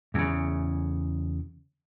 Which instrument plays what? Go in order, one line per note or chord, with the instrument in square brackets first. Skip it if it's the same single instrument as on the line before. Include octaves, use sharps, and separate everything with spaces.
[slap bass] E2 C#3